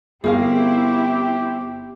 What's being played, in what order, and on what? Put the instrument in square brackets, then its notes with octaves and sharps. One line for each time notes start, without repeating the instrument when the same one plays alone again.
[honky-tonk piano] G1 [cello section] C4 E4 [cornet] G4 [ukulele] G#4 A#4 F5